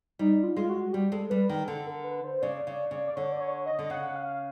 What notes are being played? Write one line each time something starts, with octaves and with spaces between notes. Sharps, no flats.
G3 D#4
F4
G#3 F4
F#4
G3 G4
G#3 A4
G3 B4
D#3 A#4
G#4
D3 A4
A#4
B4
C5
C#3 D5
C#3
C#3
D5
D3 C#5
D5
C#5
D#5
D3
C#3 F#5
F5